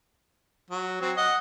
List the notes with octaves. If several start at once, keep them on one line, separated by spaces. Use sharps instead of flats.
F#3
F#3 C4
D#5 F#5